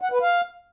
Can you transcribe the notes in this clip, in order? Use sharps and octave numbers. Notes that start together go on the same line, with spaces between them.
F#5
B4
F5